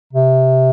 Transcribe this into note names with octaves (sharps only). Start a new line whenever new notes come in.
C3